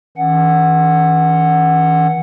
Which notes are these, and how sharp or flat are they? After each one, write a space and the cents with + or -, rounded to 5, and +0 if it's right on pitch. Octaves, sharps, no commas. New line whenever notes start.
E3 -40 C#4 +5 F#5 +0